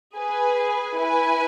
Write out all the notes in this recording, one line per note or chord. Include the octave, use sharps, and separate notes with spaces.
G#4 B4 G#5
E4 B4 G#5